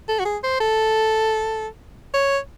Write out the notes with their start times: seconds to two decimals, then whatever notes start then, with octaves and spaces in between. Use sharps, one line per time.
0.09 A4
0.19 F#4
0.25 G#4
0.43 C5
0.60 A4
2.14 C#5